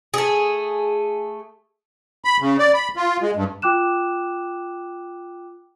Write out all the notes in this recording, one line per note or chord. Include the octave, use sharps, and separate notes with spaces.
A3 G#4
B5
C#3
D5
B5
F4
G#3
G2
F4 G5 D6 F#6 E7